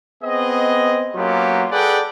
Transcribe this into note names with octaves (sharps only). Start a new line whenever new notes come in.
B3 C4 G#4 D#5
F#3 A#3 B3 C#4 F4 G4
G#4 A4 B4 D5 F#5 G5